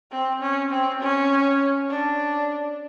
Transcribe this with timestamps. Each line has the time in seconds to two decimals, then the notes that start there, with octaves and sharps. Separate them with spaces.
0.12 C4
0.41 C#4
0.71 C4
1.00 C#4
1.90 D4